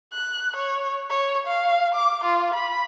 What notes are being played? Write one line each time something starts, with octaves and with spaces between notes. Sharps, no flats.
F#6
C#5
C#5
F5
D6
F4
B5